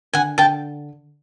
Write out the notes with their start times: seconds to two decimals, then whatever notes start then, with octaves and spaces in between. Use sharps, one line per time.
0.13 D3 F#5 G#5
0.38 D3 G5 A5